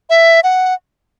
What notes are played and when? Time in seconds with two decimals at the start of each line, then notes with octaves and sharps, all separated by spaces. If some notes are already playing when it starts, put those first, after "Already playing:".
0.10 E5
0.44 F#5